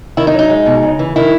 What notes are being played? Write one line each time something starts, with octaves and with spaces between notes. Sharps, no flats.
D#3 E4
D#4
F#3
D#4
G#3
B2
C#3
E3
D#3 E4